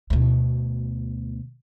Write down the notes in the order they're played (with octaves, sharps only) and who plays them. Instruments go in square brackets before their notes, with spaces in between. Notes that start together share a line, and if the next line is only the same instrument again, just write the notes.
[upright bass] D2 B2